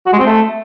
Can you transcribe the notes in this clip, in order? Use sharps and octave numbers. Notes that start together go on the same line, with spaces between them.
F#4
G#3
C4
A3